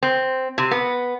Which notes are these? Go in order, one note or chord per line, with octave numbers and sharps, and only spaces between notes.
C4
C3
B3